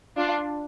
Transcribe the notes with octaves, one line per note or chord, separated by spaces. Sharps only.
D4 F4